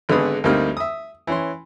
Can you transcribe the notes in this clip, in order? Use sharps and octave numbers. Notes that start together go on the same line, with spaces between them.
G#1 D3 G#3 B3 B4 D#6
D2 G3 A#3 C4 D#4 F6
E5 D#6
E3 C#4 C6